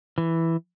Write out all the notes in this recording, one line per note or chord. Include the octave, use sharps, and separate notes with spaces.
E3